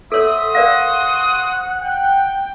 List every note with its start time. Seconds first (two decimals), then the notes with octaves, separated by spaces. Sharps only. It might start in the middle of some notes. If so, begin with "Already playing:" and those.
0.12 F#4 A4 C5 C#5 E5 D#6
0.55 A#4 D5 F5 F#5
1.82 G5